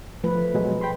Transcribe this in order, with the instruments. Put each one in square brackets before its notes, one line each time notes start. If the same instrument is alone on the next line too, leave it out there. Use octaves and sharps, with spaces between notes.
[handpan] F3 A3 B4
[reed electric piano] B2 F#3 G#3
G5 B5 C6